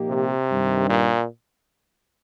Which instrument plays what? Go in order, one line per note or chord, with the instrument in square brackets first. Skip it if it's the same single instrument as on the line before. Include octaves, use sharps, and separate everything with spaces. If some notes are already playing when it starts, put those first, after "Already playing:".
Already playing: [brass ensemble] A#2 F3 A#3 D#4 G4
[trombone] C3
[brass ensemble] G2 D#3 G3
[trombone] A#2